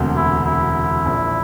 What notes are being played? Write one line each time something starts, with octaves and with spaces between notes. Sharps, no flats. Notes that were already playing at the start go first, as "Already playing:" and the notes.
Already playing: E1 D2 C3
E4
E4
A#1 A#2 F3